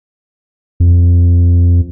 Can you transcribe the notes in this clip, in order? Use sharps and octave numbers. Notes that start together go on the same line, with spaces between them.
F2